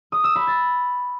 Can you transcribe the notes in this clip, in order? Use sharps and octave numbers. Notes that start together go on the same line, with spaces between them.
D#6
E6
B5
A6